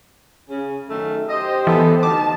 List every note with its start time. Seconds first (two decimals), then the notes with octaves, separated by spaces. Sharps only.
0.49 C#3
0.89 F#2 D#3 A3
1.29 G4 C5 D#5
1.67 E3 B3 A4
2.03 D2 D#4 A5 D6